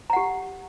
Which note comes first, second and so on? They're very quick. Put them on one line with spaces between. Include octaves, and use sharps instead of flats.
A#5 F#5 G4